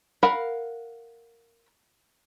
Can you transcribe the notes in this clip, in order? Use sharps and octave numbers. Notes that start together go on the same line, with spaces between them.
A#4 F5 F#5 B5